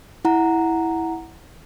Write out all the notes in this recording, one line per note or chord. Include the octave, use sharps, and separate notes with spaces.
E4 F#5 A#5